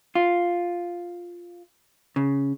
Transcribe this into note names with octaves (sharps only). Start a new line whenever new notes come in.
F4
C#3